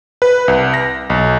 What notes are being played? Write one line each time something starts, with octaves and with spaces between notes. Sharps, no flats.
B4
C2
A#6
B1